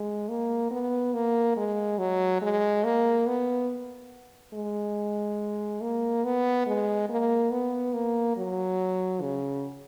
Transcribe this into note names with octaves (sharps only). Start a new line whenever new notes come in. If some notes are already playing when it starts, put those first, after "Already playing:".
Already playing: G#3
A#3
B3
A#3
G#3
F#3
G#3
A#3
B3
G#3
A#3
B3
G#3
A#3
B3
A#3
F#3
C#3